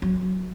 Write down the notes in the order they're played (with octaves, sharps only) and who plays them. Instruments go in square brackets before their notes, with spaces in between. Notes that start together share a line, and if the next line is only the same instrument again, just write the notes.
[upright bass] F#3